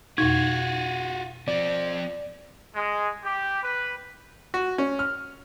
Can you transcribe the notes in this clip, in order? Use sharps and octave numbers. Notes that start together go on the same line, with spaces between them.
F2 B2 D#4 F4 F#4 G#6
F3 C4 D5
G#3
G4
B4
F#4
C#4
F6